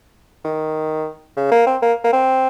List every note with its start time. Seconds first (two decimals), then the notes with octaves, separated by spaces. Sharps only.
0.44 D#3
1.37 C#3
1.51 A#3
1.66 C4
1.82 A#3
2.04 A#3
2.13 C4